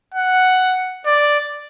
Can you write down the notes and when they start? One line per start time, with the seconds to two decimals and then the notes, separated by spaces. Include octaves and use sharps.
0.15 F#5
1.06 D5